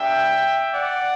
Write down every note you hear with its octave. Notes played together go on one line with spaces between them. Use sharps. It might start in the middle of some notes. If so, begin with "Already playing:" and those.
Already playing: G3 B3 D4 G4 E5 G5
D5 F#5